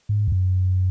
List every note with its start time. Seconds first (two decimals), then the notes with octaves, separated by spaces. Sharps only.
0.09 G#2
0.28 E2
0.32 F#2